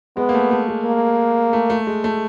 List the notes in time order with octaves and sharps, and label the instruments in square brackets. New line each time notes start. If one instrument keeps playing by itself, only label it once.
[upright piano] G#3 [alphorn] B3
[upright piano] A#3
A3
A3
G#3
[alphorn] A#3
[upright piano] A3
A3
G#3
A3